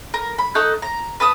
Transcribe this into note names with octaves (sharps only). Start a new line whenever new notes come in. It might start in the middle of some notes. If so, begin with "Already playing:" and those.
A#4
B5
D#4 A4 F#5 C#6
A#5
B4 A5 D#6